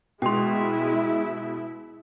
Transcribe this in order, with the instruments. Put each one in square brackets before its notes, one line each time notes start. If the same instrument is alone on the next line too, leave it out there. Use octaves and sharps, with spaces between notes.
[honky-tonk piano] B2 [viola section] G#3 [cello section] E4 [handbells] G5 C6